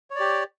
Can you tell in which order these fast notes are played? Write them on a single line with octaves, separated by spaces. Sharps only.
C#5 D5 G4